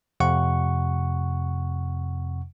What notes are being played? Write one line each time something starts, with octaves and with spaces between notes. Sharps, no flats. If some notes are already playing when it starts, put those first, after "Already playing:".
F2 C3 F#5 C#6